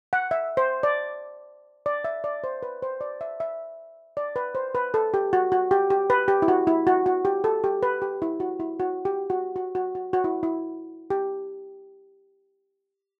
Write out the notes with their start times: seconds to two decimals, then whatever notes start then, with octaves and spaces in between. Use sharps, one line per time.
0.13 F#5
0.31 E5
0.57 C5
0.83 D5
1.86 D5
2.04 E5
2.24 D5
2.44 C5
2.63 B4
2.83 C5
3.01 D5
3.21 E5
3.40 E5
4.17 D5
4.36 B4
4.55 C5
4.75 B4
4.94 A4
5.14 G4
5.33 F#4
5.52 F#4
5.71 G4
5.90 G4
6.10 B4
6.28 G4
6.42 E4
6.48 F#4
6.67 E4
6.87 F#4
7.06 F#4
7.25 G4
7.44 A4
7.64 G4
7.83 B4
8.02 G4
8.22 E4
8.40 F#4
8.60 E4
8.80 F#4
9.05 G4
9.30 F#4
9.56 F#4
9.75 F#4
9.95 F#4
10.13 F#4
10.24 E4
10.43 E4
11.10 G4